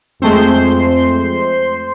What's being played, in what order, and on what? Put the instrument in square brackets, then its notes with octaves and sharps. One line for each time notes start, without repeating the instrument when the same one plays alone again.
[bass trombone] F2 [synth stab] G#3 A3 C4 [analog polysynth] C5 C6